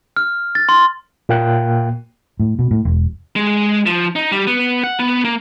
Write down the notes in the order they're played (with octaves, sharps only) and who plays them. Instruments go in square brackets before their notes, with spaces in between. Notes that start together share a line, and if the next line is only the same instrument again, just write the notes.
[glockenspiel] F6
A6
C6
[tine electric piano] A#2 A#3 G5 F#6
[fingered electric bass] A2
B2
A2
E1
[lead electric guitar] G#3
F3
D#4
G3
B3
F#5
B3
A#3